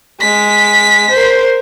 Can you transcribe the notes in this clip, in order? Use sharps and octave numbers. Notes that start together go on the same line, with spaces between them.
G#3 B6
A#4 C5